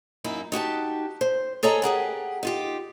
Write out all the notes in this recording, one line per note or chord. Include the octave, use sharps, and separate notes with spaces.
F#2 A#3 D#4 E4
D#4 F#4 G4 A5
C5
G#4 A4 C#5 D#5 G#5 A#5
G4 G#4 A#4 F#5
D#4 F4 G4